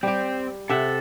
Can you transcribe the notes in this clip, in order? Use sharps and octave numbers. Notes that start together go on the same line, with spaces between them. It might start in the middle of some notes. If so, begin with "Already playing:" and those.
G3 C4 G4
C3 A4 E5 F#5